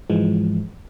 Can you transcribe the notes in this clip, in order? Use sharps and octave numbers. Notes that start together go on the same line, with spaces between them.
G#2 E3 F3 G#3